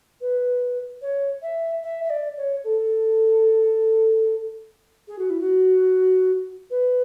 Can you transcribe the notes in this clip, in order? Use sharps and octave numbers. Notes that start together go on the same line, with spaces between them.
B4
C#5
E5
E5
E5
D5
C#5
A4
G#4
F#4
E4
F#4
B4